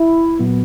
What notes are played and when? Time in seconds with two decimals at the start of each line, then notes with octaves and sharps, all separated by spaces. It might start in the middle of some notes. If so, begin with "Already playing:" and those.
Already playing: E4
0.39 A#2 F#3 B3